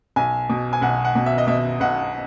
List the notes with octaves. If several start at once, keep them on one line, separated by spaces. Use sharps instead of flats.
B1 G#5
B2
G#5
B1 F#5
F#5
B2
E5
D#5
B2 E5
B1 F#5